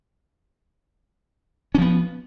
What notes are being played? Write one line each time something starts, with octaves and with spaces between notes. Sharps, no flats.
F3 B3 C#4